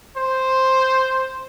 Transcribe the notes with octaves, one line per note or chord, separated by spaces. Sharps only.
C5